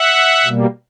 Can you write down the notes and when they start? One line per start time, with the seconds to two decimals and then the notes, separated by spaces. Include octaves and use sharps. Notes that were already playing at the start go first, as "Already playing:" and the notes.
Already playing: E5 F#5
0.45 B2 G3 A#3